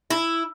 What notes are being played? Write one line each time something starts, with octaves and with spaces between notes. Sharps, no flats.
E4